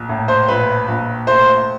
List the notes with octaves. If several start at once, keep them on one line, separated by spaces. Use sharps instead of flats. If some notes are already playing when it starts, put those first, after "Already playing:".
Already playing: A#1
A2
C5
A#1 B4
A#1
A3 C5